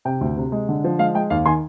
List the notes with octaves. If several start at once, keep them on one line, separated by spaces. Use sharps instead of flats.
C3 G5
D2
C3
G#3
D3
F3
G#3 F5
G#3 G5
D#2 F5
D#3 G#5 C6